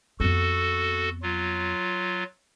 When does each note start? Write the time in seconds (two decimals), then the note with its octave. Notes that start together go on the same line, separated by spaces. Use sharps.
0.20 F2 B3 F#4 A4
1.22 F#3 F4